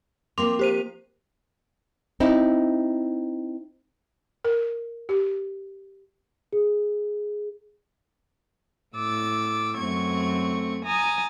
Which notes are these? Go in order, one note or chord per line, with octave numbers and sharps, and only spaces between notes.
F3 A#3 C4 C6 D6 F7
G4 C5 D#7
C4 D#4 E4
A#4
G4
G#4
A2 D6 E6 A6
F#2 A3 C4 C#6 G#6
G#5 A#5 D#6 A6